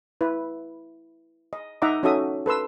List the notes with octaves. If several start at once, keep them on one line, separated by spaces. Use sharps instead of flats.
E4 B4
D#5
D#4 D#5 E5 F#5 A#5 D6
C#4 D#4 F#4 A4 E5 D#6
A4 B4 C6 E6